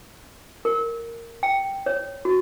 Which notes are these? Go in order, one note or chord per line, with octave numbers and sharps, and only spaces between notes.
A#4
G5
C#5
F#4